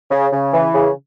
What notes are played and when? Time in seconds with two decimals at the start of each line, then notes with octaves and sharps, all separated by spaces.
0.11 C#3
0.32 C#3
0.53 E3
0.74 C#3